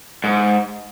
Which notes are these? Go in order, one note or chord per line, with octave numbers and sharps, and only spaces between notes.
G#2